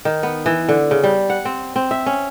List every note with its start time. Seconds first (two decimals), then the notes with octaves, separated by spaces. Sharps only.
0.05 D#3
0.23 B3
0.46 E3
0.69 D3
0.91 C#3
1.03 G3
1.30 F#5
1.45 C4
1.76 C4
1.91 E5
2.06 C#4